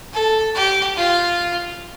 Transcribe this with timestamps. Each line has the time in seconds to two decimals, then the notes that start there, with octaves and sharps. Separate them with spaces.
0.13 A4
0.55 G4
0.96 F4